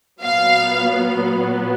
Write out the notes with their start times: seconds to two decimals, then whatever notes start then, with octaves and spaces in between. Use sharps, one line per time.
0.22 A#2 F#3 B3 F5